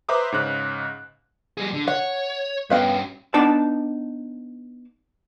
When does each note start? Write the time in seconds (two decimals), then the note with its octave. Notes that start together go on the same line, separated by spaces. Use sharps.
0.09 B4 C5 E5 A#5 D6 D#6
0.32 G#2 C#3 F#6
1.58 G3 G#4
1.73 D3
1.88 C#5 F#5
2.70 G2 B3 C#4 F5 G5
3.34 B3 D4 D#4 D5 A5